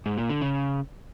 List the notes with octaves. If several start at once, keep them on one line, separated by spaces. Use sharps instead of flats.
G#2
A#2
D3
C#3